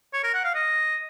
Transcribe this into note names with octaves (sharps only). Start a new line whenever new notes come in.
C#5
A#4
F#5
F5
D#5